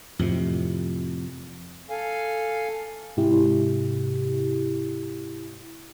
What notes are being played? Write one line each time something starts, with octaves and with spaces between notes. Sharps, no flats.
F2 A2 C3
A4 F5 G#5
G#2 C3 E4 G4